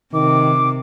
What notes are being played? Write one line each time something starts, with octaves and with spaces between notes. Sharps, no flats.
C3 D#3 D6